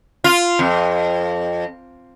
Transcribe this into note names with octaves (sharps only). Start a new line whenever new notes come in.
F4
F2